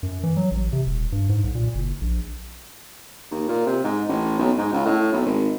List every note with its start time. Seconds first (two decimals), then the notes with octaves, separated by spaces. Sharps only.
0.03 F#2
0.23 E3
0.37 F#3
0.51 A1
0.72 C3
0.86 D#1
1.12 G2
1.29 G#2
1.44 B1
1.55 A#2
1.75 F#1
2.01 A#1
3.31 D#2
3.48 A#2
3.66 C3
3.84 G#2
4.09 A1
4.39 B1
4.58 G#2
4.73 C#2
4.86 A2
5.13 B1
5.26 G#1